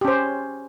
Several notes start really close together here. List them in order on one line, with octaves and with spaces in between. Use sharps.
G4 C#4 C5